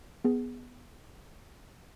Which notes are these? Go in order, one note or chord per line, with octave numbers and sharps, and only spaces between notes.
B3 G#4